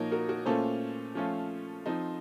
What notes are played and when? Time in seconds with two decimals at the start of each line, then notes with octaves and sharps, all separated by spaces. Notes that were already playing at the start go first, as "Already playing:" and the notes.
Already playing: A#2 F3 A#3 D#4 A#4 C#5
0.11 F#4 A#4
0.28 F#4 A#4
0.46 A#2 A3 C#4 F4 A4 C5
1.15 F3 A3 C#4 F4
1.86 F3 C4 D#4